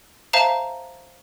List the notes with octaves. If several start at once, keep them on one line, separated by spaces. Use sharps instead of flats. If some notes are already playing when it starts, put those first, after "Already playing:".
C5 E5 F5 A5 A#5